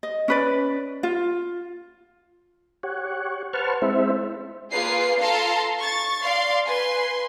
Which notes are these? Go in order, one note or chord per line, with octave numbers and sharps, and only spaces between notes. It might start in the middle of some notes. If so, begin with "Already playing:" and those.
D#5
C#4 B4 D5
F4
G4 C#5 F#5
B4 C5 F#5 A5 C#6 F6
G#3 C4 E4 C5 E5
A#3 F4 G#4 B4 C7
F4 A4 F5 A5 A#5 C6
C#6 A6
D5 F5 C6
B4 G#5 C6